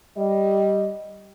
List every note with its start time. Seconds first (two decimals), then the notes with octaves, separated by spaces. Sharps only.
0.17 G3 D#5